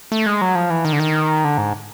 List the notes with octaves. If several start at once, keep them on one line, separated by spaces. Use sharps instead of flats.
A3
G#3
F#3
F3
E3
D#3
D3
D#3
D3
G#2